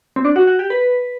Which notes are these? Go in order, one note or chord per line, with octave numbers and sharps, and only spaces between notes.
C4
D4
F#4
F#4
G4
B4